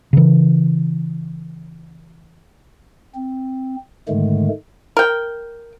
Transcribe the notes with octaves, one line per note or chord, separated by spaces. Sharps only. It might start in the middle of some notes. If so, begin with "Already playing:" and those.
C#3 E3
C4
G#2 D3 D#3 G#3 A3
A#4 G5